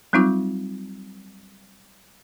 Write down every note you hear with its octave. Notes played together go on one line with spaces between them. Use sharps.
F#3 G3 C4 D#4 F4 D6